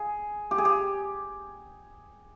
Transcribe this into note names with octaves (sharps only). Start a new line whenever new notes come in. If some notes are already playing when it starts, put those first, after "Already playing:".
Already playing: G#4
G4
G#4
G4